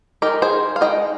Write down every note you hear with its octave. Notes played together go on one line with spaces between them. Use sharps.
G#3 D#4 G4 A#4
G#4 C5
F5
G#3 D#4 D#5 G5